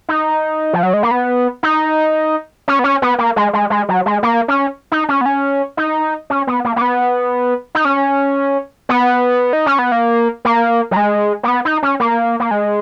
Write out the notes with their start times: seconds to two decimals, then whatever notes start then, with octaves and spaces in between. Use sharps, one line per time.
0.09 D#4
0.73 F3
0.83 F#3
0.93 G#3
1.03 A#3
1.11 B3
1.63 D#4
2.68 C#4
2.79 B3
2.84 C#4
3.02 B3
3.18 A#3
3.36 G#3
3.53 G#3
3.70 G#3
3.89 F#3
4.06 G#3
4.23 A#3
4.48 C#4
4.92 D#4
5.09 C#4
5.21 B3
5.26 C#4
5.77 D#4
6.30 C#4
6.47 B3
6.65 A#3
6.76 A#3
6.81 B3
7.75 D#4
7.85 C#4
8.89 B3
9.53 D#4
9.66 C#4
9.79 B3
9.92 A#3
10.45 A#3
10.91 F#3
10.96 G#3
11.43 A#3
11.48 B3
11.65 D#4
11.83 C#4
12.00 A#3
12.40 A#3
12.51 G#3